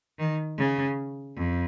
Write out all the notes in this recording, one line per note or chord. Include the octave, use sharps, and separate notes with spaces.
D#3
C#3
F2